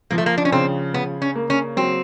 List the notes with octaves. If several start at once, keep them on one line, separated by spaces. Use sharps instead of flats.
F3 A#3
A3
A#3
D4
C#4
C#3 C4
C#3 B3
C#4
A#3
C#4
F#3 C4